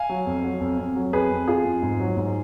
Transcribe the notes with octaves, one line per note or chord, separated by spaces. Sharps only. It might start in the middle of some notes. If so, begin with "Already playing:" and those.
Already playing: F5 G#5
F#3
F2
F#3
F2
F2
F#3
F2 G#4 B4
F2
F2 F4 G#4
F2
G#2
F#3
G#2